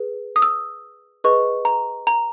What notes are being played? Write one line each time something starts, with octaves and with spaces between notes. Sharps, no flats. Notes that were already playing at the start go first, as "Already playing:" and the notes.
Already playing: G#4 B4
D#6
E6
G#4 B4 D#5 C#6
A#5
A#5